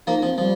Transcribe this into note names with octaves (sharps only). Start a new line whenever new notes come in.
F3 A#3 D#4
F3 C4
F3 G3